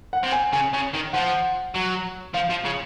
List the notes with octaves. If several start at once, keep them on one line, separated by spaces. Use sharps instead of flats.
F#5
C3
G#5
C#3 G#5
C#3
D#3
F3 F#5
F#3
F3 F5
F3
C#3